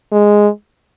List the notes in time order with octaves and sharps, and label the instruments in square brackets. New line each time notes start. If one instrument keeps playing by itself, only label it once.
[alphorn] G#3